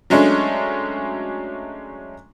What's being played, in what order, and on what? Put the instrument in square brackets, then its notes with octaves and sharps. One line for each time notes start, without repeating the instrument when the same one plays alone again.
[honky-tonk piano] F#3 G#3 A3 C#4 D4